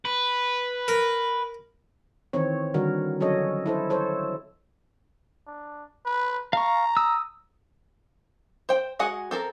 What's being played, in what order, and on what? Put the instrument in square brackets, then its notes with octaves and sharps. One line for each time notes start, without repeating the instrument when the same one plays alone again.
[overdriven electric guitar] B4
[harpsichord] A#4
[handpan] D#3 E3 C4 C#5
D3 D#3 G3 F#4 A#4
F#3 C#4 A4 C#5 D#5
E4 A4 C5
A4 C5 C#5
[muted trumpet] D4
B4
[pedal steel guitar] F5 C#6 [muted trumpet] A#5
[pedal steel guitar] D#6 E6
[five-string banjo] C5 G5
G#3 F#4 G#4 F#5
C4 A4 A#4